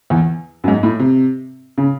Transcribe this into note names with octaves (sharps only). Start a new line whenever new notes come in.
E2
F#2
G#2
A2
C3
C#3